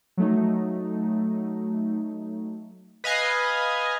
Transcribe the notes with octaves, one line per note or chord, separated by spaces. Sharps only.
F#3 A3 D#4
B4 D#5 F5 G#5